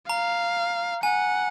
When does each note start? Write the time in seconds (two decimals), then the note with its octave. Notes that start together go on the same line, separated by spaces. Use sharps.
0.09 F5 A#5
1.03 F#5 G#5